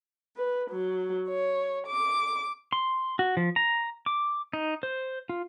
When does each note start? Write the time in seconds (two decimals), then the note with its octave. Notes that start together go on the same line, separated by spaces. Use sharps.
0.37 B4
0.70 F#3
1.29 C#5
1.86 D6
2.73 C6
3.19 F#4
3.37 F3
3.56 A#5
4.06 D6
4.53 D#4
4.83 C5
5.29 F4